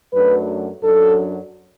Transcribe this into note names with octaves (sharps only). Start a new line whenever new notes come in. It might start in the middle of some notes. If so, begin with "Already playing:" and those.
F#2 F#3 A3 D4 B4
F#2 F#3 D4 A4